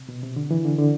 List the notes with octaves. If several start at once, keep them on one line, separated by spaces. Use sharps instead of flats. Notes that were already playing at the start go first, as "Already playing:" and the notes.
Already playing: C3
B2
C3
D3
E3
D3
D3